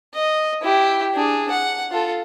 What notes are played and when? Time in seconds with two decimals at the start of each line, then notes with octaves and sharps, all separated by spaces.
0.14 D#5
0.62 E4 G4
1.15 D4 G#4
1.50 F#5
1.91 F4 A4